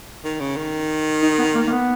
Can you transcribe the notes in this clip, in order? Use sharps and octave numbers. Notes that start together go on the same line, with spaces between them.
D#3
C#3
D#3
D#4
B3
A#3
A#3
B3